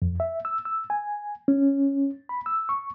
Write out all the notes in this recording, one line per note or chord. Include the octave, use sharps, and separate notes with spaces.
F2
E5
E6
E6
G#5
C#4
B5
E6
C#6